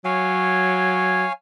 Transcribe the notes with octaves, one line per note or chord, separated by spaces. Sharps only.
F#3 C#5 F5 G#5